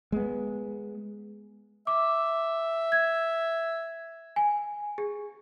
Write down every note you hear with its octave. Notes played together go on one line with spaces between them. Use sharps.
G#3 B3
E5 D6
G#6
G#5
G#4